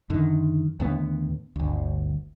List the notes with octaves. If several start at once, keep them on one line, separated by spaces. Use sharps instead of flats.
F#2 D3 D#3
D#2 A2 D3 B3
G1 D2